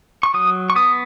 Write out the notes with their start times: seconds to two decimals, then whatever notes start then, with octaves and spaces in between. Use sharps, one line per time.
0.23 C#6
0.34 F#3 D#6
0.70 C#6
0.75 B3 D#6